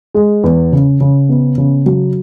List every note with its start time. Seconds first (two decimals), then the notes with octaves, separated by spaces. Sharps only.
0.14 G#3
0.44 E2
0.72 C#3
1.00 C#3
1.29 B3
1.58 C#3
1.86 F#3